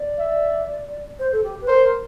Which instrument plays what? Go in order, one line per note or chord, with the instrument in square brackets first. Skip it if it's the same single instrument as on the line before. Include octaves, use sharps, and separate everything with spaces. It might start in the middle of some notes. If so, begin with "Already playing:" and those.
Already playing: [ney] D5
[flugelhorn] E5
[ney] C5
A4
G4
B4
[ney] A#4 [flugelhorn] C5